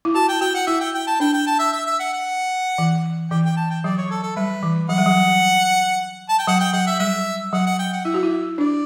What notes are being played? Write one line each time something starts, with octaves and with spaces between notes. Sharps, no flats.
E4
F#4 A5
G5
F#4 G5
F#5
E4 E5
G5
G5
A5
D4 G5
G5
A5
E5
E5
E5
F#5
F#5
E3
E3 G5
G5
A5
G5
F#3 D5
C#5
A4
A4
G3 B4
E3
F#3 F#5
G3
F#3
A5
G5
F#3 F#5
G5
F#3 F#5
E5
G3 E5
F#3 F#5
F#5
G5
F#5
E4 E5
F#4
E4
D4 D5